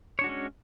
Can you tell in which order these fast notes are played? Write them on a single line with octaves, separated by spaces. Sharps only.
C#5 D4 F#4 G#3 C#4